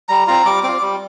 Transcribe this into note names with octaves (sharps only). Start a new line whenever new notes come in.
G3 A#5
C4 F4 A#5
G3 D6
C4 F4 D6
G3